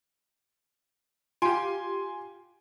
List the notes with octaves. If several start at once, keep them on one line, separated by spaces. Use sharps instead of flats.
F4 G4 G#5 C6 D7